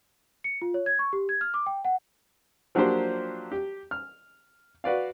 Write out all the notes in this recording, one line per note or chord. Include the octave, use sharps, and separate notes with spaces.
C#7
F4
C#5
G#6
C#6
G4
G#6
F6
D6
G5
F#5
F3 F#3 A#3 D4 G4 C5
G4
F6
F#4 B4 D5 F5